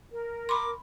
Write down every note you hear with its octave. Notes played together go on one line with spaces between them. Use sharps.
A#4
B5 C6 D6